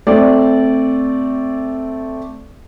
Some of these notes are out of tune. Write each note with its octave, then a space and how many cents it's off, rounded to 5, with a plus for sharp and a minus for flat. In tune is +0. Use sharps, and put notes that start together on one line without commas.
A3 +0 C4 -5 D5 -15